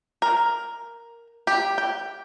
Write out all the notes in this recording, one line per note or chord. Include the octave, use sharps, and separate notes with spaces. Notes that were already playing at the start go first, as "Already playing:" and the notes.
A#4
G4
G5